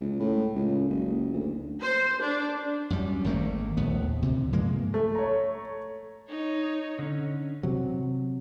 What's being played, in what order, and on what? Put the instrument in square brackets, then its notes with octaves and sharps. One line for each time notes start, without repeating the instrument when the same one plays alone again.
[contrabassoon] C#2
A2
C#2
F#1
D2
[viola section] C5
D4
[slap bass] F#2 G3
G#1 D#3 A3 A#3
A#1 D#2 A2 B3
D2 C3
G2 F3 G#3 A#3
[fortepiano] A3
[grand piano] C#5 A#5
[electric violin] D#4 C#5
[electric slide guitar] D3 C#4
[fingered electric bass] C3 F#3